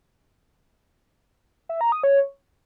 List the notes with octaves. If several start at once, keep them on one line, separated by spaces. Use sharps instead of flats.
E5
A#5
D#6
C#5